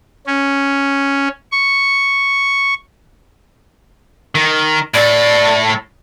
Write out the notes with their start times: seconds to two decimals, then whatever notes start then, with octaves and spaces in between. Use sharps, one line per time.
0.27 C#4
1.52 C#6
4.35 D#3
4.94 A2 A4 D5